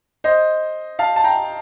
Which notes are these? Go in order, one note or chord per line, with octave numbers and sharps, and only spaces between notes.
C5 D#5
F5 A5
A5
G5 A#5